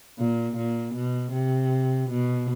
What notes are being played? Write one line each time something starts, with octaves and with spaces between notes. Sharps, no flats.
A#2
A#2
B2
C3
B2